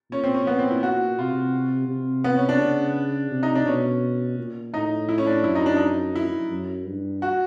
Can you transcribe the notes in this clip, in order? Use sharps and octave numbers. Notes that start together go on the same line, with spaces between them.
A#2 C#4
C4
C#4
B3
C4
E4
F#4
C3 F4
C3
B3
C#4
D4
C#3
C3
D#4
D4
B2 C#4
A#2
A2 D#4
E4
C#4
D4
F#2 E4
D#4
D4
D#4
E4
F#2
G2
F#4